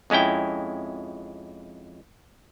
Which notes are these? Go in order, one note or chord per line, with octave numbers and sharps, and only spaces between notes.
F2 G#3 C#4 E4 G5